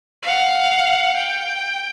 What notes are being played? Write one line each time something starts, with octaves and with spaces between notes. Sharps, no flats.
F5 F#5
G5